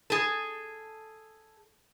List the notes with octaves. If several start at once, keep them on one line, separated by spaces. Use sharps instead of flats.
G#4 A4